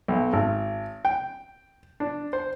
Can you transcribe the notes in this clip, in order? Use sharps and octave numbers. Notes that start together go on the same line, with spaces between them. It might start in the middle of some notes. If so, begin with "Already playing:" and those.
B1
G#1
G5
D4
C5